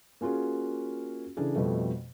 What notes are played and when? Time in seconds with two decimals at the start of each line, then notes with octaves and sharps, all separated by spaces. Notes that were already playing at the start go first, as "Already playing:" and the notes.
0.21 A#3 C#4 F4 F#4 G#4
1.37 C#3 E3 D4 G#4 A4
1.56 F2 B2 G3 A3